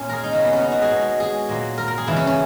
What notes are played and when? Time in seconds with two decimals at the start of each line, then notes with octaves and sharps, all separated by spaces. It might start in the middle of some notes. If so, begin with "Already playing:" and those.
Already playing: A#2 A#3 C#4
0.09 G#4 A#4
0.24 D#4
0.32 C#3 F#3 A#3 C#4
0.43 B3
0.53 C#4
0.62 D#4
0.72 F#4
0.82 G#4
0.90 B2 G#3
1.20 G#4
1.49 A#2 F#3 A#3
1.78 A#4
1.88 A#4
1.98 G#4
2.07 C#3 E3 A#3 E4
2.16 C#4
2.27 C#4